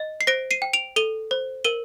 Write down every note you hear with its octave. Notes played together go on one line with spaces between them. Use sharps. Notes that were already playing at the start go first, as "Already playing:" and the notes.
Already playing: D#5
C7
C5 A#6 D7
C7 D#7
G5
D7 F7
A4 D#7 G7
C5
A#4 D#7 G7